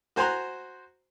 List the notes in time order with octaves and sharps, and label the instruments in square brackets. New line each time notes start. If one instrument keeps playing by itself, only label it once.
[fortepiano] F#4 C5 G#5 A#5 C6 F#6